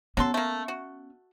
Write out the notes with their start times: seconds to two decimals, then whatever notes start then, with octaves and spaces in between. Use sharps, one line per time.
0.17 F#3 B3 C#4 A4 C6
0.34 A3 A#3
0.68 F#4